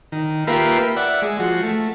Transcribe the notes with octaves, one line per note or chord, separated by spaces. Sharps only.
D#3
A#3 F4 G4 A#4 B4 E5
D5 E5 F#5
G#3
F3 F#4
A3